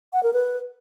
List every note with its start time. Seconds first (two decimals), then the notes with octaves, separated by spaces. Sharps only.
0.13 F#5
0.23 A#4
0.33 B4